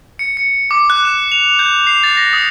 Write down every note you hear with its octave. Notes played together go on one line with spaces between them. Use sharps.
C#7
C#7
D6
F#6
E7
F7
G6
C7
A6
A#6
D#6